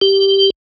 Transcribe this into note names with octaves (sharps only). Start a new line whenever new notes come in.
G4